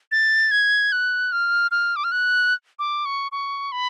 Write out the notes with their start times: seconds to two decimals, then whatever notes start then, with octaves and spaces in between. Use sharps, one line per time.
0.12 A6
0.51 G#6
0.92 F#6
1.32 F6
1.71 F6
1.96 D6
2.04 F6
2.12 F#6
2.79 D6
3.05 C#6
3.32 C#6
3.72 B5